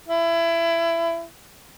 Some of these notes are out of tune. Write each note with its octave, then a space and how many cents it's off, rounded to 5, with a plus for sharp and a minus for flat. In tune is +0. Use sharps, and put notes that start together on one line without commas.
E4 +25